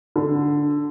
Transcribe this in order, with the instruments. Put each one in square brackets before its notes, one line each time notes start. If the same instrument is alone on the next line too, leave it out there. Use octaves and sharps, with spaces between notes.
[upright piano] D3